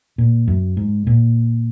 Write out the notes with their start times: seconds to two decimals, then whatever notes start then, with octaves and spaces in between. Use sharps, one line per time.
0.18 A#2
0.48 F#2
0.77 G#2
1.07 A#2